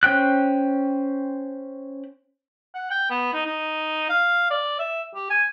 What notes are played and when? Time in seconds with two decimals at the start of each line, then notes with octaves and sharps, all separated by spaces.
0.03 C#4 C5 G5 F#6
2.75 F#5
2.91 G5
3.10 B3
3.33 D#4
3.46 D#4
4.10 F5
4.50 D5
4.79 E5
5.15 G4
5.30 G#5